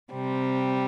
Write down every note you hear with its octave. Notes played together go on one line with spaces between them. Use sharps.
C3 G3 C4